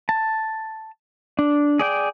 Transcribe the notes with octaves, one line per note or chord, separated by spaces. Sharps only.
A5
D4
G#4 D5 G5